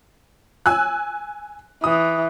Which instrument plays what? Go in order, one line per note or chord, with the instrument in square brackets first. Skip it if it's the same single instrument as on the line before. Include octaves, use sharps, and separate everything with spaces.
[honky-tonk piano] G#5 E6 F#6
[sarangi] E3 [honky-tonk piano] D#6